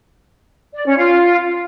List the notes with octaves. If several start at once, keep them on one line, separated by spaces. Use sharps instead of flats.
D5
C#4
F4